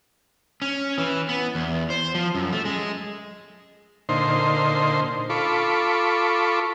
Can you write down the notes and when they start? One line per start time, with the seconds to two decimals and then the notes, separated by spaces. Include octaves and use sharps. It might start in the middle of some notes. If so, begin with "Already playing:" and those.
0.62 C#4
0.98 E3
1.29 B3
1.55 E2
1.90 C5
2.15 F3
2.35 F#2
2.53 A3
2.65 G#3
4.09 A#2 D3 D#4 C5 C6
5.30 F4 A4 B5 C#6 D6